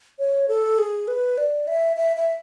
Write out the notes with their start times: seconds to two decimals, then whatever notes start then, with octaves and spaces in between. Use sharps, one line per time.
0.19 C#5
0.48 A4
0.78 G#4
1.08 B4
1.38 D5
1.67 E5
1.97 E5
2.16 E5